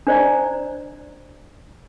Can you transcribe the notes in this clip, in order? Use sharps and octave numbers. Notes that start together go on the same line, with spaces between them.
D4 C5 D5 A#5